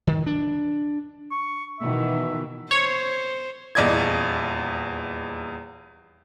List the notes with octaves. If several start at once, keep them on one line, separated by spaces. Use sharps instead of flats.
D#3
D4
C#6
B2 D#3 E3 E5
C5 C#5
D#1 E2 D5 D#5 G#6